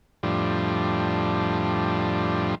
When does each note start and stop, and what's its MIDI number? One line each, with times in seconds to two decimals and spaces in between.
0.23 2.55 41
0.23 2.55 45
0.23 2.55 53
0.23 2.55 55
0.23 2.55 62